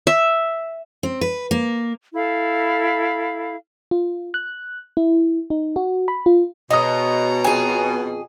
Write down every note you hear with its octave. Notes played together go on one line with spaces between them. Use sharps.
E5
C4
B4
A#3
E4 A4 F5 B5
F4
F#6
E4
D#4
F#4
B5
F4
B2 G#3 C#5 D#5 A#5 D#6
F2 G#4 G#5